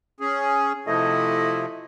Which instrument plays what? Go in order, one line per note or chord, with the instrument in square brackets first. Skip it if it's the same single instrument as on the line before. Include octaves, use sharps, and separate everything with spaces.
[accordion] C#4 G#4
[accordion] C3 F3 [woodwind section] A3 E4 D#5